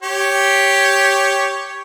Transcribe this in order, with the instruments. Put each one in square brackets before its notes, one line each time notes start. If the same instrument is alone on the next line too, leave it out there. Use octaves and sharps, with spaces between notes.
[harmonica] G4 C#5